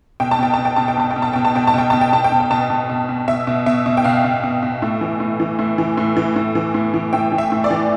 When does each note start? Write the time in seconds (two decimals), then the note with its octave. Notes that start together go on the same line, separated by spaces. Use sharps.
0.20 B2 G5
0.31 A5
0.39 B2 G5
0.54 B2 A5
0.65 G5
0.76 B2 A5
0.88 G5
0.97 B2 A5
1.11 G5
1.16 B2
1.22 A5
1.33 B2 G5
1.45 A5
1.55 B2 G5
1.67 A5
1.74 B2 G5
1.90 B2 A5
2.01 G5
2.12 B2 A5
2.24 G5
2.32 B2
2.40 G5
2.51 B2 A5
2.70 B2
2.89 B2
3.09 B2
3.28 B2 E5
3.47 B2
3.66 B2 E5
3.86 B2
3.97 G5
4.04 B2 F5
4.24 B2
4.43 B2
4.62 B2
4.82 A2
5.01 E3
5.20 A2
5.40 E3
5.59 A2
5.78 E3
5.98 A2
6.17 E3
6.36 A2
6.55 E3
6.74 A2
6.94 E3
7.13 A2 G5
7.32 E3
7.38 E5
7.52 A2
7.64 D5
7.70 E3